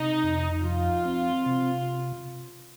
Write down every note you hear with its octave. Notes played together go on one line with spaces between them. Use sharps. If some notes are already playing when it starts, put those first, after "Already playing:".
Already playing: C3 D#4
F2
F3 F4
C4
C3